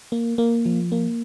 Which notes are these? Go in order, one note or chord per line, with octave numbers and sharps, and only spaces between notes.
A#3
A#3
F3
A#3